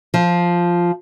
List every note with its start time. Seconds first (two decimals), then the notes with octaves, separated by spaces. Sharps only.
0.14 F3